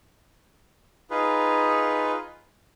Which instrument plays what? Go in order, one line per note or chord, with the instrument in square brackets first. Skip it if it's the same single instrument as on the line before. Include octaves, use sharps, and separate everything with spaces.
[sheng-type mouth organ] D#4 F4 G#4 B4